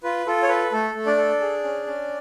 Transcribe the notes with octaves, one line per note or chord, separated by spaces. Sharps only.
F4 B4
F4 A4
C#5
A4 B4
A3 A4
A3
D4 D5
A4
G#4
C#4
C#4